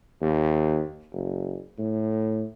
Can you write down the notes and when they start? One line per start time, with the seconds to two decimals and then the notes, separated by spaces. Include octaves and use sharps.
0.22 D#2
1.13 F#1
1.79 A2